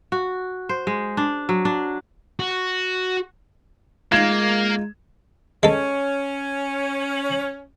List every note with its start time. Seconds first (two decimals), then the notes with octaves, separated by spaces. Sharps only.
0.12 F#4
0.69 C5
0.87 G#3
1.17 D4
1.49 F#3
1.65 D4
2.40 F#4
4.12 G#3 A#3 D#4 F4 G#6 E7
5.63 G#3 C#4 A4